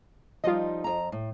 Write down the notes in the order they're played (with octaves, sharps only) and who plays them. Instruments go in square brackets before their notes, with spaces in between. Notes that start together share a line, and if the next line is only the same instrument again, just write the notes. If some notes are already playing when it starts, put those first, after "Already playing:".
[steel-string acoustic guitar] F3 G3 D#4 [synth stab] F4 D#5
[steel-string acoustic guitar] F2 A#5
A2